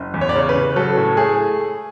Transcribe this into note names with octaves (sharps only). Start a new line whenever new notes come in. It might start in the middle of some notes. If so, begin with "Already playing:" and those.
Already playing: F#1
E2
C#5
D5
C#3 C#5
B4
C#3
F#3 A4
A2
A3 G#4